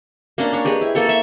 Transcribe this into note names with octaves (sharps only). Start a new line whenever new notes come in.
A#3 C#4 D4
D4 C#5
G4 G#4 B4 D#5
E4
A#3 A4 C#5
E5